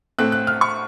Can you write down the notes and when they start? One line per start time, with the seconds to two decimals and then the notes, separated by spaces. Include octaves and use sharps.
0.18 A2 A3 C4 F#6
0.32 F#6
0.47 F6
0.61 C#6